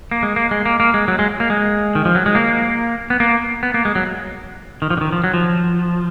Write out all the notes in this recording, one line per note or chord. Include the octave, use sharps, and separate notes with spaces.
A#3
G#3
A#3
G#3
A#3
A#3
G#3
F#3
G#3
A#3
G#3
D#3
F3
F#3
G#3
A#3
B3
A#3
B3
A#3
G#3
F#3
D#3
F3
D3
D#3
F3
F#3
F3